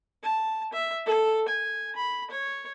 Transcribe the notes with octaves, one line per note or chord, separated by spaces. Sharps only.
A5
E5
A4
G#5
B5
C#5